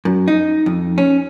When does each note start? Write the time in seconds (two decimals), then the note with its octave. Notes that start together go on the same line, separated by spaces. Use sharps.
0.05 F#2
0.28 D#4
0.66 F2
0.98 C#4